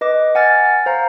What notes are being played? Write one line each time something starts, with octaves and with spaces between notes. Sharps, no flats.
B4 D#5 D6
F#5 G#5 F6 A6
C5 F5 A#5